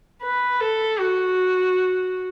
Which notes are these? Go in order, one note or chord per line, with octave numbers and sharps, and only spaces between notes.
B4
A4
F#4